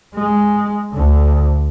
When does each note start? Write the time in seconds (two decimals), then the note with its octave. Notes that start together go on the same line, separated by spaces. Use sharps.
0.16 G#3
0.94 D2 D3